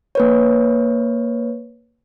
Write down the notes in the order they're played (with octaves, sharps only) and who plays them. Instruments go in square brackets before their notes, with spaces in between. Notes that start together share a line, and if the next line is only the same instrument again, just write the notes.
[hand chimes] A#3 B4 C#5